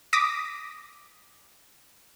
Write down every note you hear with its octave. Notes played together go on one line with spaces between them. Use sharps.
D6 D#6 A#6 B6